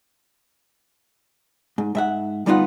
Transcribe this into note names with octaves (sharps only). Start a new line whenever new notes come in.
G#2
G#2 E5 F#5
D2 G3 B3 D#4 F4 F#5